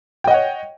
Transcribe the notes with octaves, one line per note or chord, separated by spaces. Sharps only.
C#5 D#5 F#5 G5